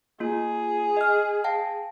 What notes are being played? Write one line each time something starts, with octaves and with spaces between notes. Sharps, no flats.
A#3 F4 G#4
D#5 F6
F5 G5 A5